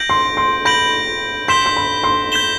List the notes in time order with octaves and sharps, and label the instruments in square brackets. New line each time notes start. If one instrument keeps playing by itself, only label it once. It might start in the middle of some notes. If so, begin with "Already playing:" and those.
Already playing: [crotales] G6 A#6 D7 F#7
[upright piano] C6
C6
[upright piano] B5 [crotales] G6 A#6 D7 F#7
[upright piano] C6 [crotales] G6 B6 E7 G7
[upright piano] C6
B5
C6
[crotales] G6 B6 E7 G7